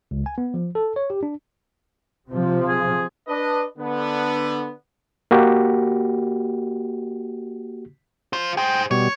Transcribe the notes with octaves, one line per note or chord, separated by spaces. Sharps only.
C#2
G#5
B3
F3
A4
C#5
G4
D4
C3 F3
G#4
D4 B4 D#5
D3 B3
A#3 F#4 G4
F4 C5
G#4 C5 G5
B2 G3 C#5